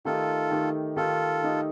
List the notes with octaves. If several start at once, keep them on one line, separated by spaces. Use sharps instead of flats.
D#3 A3 D#4 F4 G4 A4
D#3 A3 D#4 G4
D#3 A3 D#4 F4 G4 A4
D#3 A3 D#4 G4